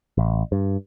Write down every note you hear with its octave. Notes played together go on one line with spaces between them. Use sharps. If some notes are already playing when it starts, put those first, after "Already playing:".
A1
G2